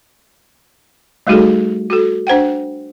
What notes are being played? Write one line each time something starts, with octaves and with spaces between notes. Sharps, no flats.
G3 A3 D#4 F#4 G#4 A4
F#4 A4
D4 C5 F#5 G5